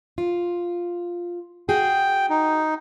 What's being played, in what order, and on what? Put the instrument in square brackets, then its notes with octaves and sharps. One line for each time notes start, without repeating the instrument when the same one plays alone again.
[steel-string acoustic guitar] F4
[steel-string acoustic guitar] F#4 G#4 [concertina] G5
[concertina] D#4